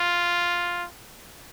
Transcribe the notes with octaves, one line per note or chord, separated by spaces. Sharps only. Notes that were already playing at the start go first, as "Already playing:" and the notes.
Already playing: F4